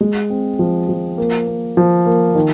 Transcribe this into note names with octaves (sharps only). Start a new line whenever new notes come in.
G#3
C4
F3
F3
A#3
A#3
F3
A#3
D#3